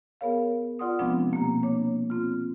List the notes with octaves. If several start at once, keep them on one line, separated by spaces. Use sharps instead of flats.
B3 G#4 A#4 C#5 F5
F4 D5 F#5 C6 D#6
C3 F3 G#3 B3 C4 D4
B2 A#3 G4 A#5
A#3 D4 C#5
C4 F4